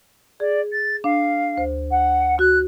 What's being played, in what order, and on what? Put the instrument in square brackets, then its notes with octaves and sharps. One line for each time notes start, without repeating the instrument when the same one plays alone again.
[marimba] G#4 [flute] D5
[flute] A6
[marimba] D4 [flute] F5
[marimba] D2 C5
[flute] F#5
[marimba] F#4 [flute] F#6